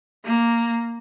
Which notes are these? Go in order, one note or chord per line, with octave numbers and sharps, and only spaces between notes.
A#3